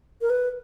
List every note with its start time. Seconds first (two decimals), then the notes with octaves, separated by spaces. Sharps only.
0.21 A#4
0.30 B4